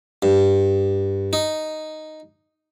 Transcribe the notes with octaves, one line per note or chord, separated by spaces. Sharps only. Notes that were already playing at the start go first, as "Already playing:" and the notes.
G2
D#4